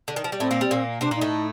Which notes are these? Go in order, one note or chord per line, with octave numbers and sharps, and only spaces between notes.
D3
D#3
F3
G3
A2 A3 C4
A#2 A#3
G3
A#2 A#3
C3 C4 D4
A#2 A#3
D#4
A2 A3